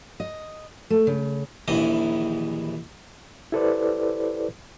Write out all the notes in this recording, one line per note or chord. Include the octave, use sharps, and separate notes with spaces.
D#5
A3
C#3
A#1 D#2 E3 D#5
E4 G4 A4 B4 C5 D5